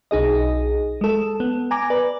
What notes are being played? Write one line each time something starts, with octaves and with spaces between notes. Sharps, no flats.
B1 D#4 G#4 D#5
G#3 A4
B3
G#5 A#5 D6
B4 D5